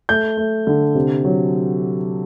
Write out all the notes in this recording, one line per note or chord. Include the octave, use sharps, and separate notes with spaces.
A3 G6
A3
D3
C3
F#3